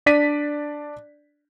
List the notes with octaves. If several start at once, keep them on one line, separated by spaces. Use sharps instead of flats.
D4 D5 B6 D#7